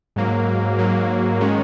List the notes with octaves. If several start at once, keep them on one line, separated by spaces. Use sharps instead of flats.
G#2 F#3 A#3
G#2 F#3 A#3
D#3 G#3 C#4